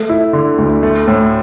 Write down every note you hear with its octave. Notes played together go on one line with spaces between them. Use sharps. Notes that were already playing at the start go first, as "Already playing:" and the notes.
Already playing: A3
E4
D3
D2
A3
A2